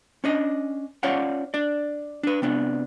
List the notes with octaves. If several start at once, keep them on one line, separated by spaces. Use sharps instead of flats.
C#4 D4 D#5
C#4 F4 C#5 D5 F5 F#5
D4 D5
D4 B4
C3 B3 D4